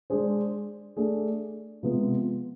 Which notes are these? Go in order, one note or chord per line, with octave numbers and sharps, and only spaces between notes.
G#3 D4 G#4 C5
A3 D4 G#4
C3 F3 G#3 B3